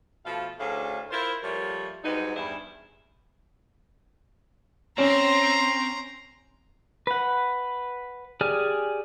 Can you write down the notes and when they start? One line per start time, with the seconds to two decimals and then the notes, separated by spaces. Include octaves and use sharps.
0.25 B2 F3 A3 A4 F5
0.59 D2 A2 C#4 D4 G#4 F5
1.10 E4 F4 A#4 C5
1.42 F3 G3 A3 A#3 A#4 C#5
2.03 G#2 F#3 G3 B3 D#4
2.35 E2 G2 G3 E4 G#4
4.98 C4 C#4 A#5 C6
7.07 B4 F#5
8.41 G4 G#4 D5 G#5 F6